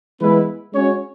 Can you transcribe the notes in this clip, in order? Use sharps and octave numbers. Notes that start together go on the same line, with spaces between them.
E3 G#3 B3 E4 B4
G#3 C#4 F#4 C#5